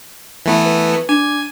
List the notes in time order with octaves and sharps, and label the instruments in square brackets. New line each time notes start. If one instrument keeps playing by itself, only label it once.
[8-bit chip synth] E3 A3 B3
[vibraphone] B4
[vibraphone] D4 [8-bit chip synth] G#5